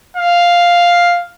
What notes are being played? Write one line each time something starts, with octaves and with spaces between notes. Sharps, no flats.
F5